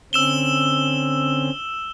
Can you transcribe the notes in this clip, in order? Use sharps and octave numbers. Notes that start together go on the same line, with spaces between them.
D3 C4 C#4 E6 E7 G7